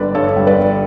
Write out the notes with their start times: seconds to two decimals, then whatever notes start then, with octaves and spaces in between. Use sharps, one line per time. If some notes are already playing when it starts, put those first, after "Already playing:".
Already playing: G1 D3 G3 B4 D5
0.15 G2 A4 C#5
0.36 G3
0.47 B4 D5
0.58 G1